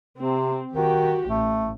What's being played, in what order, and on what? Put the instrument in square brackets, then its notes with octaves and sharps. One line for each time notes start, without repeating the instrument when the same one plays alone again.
[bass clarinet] C3 [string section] C4
[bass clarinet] D#3 [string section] F#4 G4
[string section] A1 [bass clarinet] A3